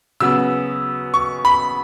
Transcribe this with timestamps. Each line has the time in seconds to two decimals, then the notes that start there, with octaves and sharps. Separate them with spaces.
0.20 C#3 F#3 B3 E6
1.14 C#6
1.45 B5